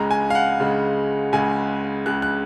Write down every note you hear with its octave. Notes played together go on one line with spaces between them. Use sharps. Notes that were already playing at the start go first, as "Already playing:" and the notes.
Already playing: C#2 C#3 G#3 A#5
G#5
F5
F#5
C#2 C#3 G#3
C#2 C#3 G#3 G#5
C#2 C#3 G#3 F#6
F#6